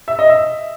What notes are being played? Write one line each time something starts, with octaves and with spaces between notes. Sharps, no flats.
E5
D#5
E5